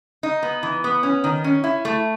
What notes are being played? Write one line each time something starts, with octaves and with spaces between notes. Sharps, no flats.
D#4
B3
E3
B3
C#4
D#3
C#4
E4
A3